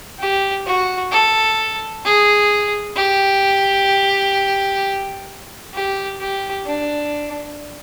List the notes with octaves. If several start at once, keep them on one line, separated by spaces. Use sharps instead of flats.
G4
F#4
A4
G#4
G4
G4
G4
D4